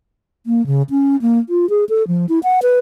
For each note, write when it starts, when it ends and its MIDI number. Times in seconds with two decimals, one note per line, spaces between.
0.46 0.65 58
0.67 0.82 49
0.90 1.16 61
1.22 1.39 58
1.49 1.69 65
1.70 1.85 68
1.89 2.06 69
2.08 2.26 53
2.29 2.39 64
2.43 2.60 78
2.63 2.79 71